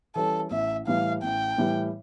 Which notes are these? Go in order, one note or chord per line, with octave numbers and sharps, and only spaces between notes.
E3 G3 C#4 A4
A1 E5
A2 E3 G3 F5
A1 G5
A2 E3 G3